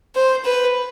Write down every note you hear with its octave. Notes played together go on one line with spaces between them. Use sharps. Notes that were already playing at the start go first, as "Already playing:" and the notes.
C5
B4